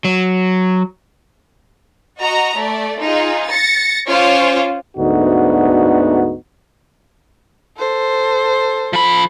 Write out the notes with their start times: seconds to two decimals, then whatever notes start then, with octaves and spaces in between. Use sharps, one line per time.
0.05 F#3
2.19 F#4 D#5 A#5
2.57 A3 D5
3.01 D#4 F4 G#4
3.50 A6 A#6 C#7
4.09 C#4 F4 C5 C#5 D6
4.97 D2 G#2 D3 B3 D#4 F#4
7.77 A4 C5
8.93 F3 B5